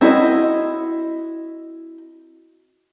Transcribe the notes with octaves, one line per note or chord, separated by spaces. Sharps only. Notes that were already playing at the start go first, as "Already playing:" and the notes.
C4 E4 F#4 A#4 D#5